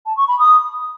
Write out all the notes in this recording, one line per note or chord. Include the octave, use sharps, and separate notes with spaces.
A5
C#6
B5
D#6